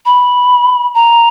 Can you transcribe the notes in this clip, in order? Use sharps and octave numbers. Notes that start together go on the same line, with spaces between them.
B5
A#5